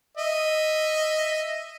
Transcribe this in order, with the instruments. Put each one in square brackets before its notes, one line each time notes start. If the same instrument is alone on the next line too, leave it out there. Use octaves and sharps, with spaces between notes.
[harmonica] D#5 E5